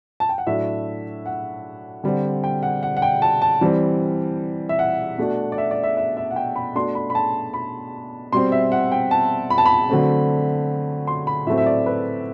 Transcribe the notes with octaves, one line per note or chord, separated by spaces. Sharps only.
A5
G5
F#5
A2 F#3 A3 D4 E5
F#5
D3 G3 C4
G5
F#5
F#5
F#5
G5
A5
A5
E3 G3 C4
E5
F#5
B2 A3 D4
D5
E5
D5
E5
E5
E5
F#5
G5
B5
B2 A3 D4 C6
B5
B5
A5
B5
B2 G3 C4 C6
E5
F#5
G5
A5
B5
A5
B5
D3 F#3 A3 C4
C6
B5
A2 F#3 A3 C4 E5
E5
D5
B4